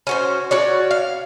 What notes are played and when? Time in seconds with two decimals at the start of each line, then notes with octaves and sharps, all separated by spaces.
0.07 C#4 F#4 C5
0.51 F#4 C#5 D5
0.91 F5